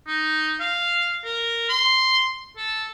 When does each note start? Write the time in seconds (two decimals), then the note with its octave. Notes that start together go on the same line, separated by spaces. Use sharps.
0.07 D#4
0.60 F5
1.24 A#4
1.69 C6
2.57 A4